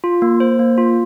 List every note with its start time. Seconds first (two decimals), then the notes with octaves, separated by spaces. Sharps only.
0.04 F4
0.22 A#3
0.40 C5
0.59 A#3
0.78 F4